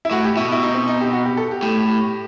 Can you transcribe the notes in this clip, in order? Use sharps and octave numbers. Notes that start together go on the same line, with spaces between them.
E4
A2 F#4
G4
B2 E4
E4
D#4
C4
D#4
G4
F#4
G4
A4
G4
A2 G4